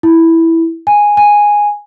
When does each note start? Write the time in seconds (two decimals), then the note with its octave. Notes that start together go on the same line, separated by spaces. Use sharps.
0.03 E4
0.87 G#5
1.17 G#5